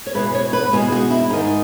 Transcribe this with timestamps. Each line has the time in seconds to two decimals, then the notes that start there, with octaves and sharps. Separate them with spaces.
0.07 C#5
0.14 E2 B2 G#3 B4
0.35 C#5
0.53 B4
0.73 E2 B2 G#3 G#4
0.92 F#4
1.10 E4
1.30 G#2 D#3 G#3 D#4